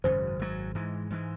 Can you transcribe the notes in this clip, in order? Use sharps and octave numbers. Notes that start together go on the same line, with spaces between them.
G#1 F#2 C#3 F#3 C5
G#1 F#2 C#3 F#3
G#2 E3 G#3
G#2 E3 G#3